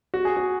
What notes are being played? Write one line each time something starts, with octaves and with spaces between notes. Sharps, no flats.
F#4
G#4
F#4